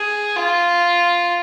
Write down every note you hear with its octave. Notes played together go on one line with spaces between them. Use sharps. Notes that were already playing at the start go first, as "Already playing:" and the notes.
Already playing: G#4
F4